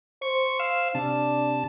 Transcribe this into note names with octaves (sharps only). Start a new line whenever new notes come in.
C5 C#6
F5 E6
C3 D4 A5